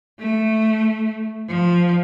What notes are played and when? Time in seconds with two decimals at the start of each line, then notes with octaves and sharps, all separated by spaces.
0.19 A3
1.49 F3